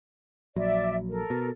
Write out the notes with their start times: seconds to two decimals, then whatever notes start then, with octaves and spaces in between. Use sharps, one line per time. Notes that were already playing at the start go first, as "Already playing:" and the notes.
0.56 A#1 F#3 D5 E5
1.10 A4 A#4
1.30 B2